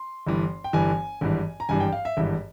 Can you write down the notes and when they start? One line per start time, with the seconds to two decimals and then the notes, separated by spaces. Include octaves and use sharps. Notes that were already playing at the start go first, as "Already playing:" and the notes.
Already playing: C6
0.27 G1 G2 E3
0.64 G5
0.73 G1 G2 E3 G#5
1.21 G#1 G2 E3
1.60 A#5
1.69 G#1 G2 E3 G#5
1.80 G5
1.93 F5
2.05 E5
2.17 G#1 G2 E3